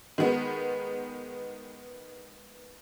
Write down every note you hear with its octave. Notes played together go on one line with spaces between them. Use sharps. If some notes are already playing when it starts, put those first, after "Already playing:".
D#3 G#3 B3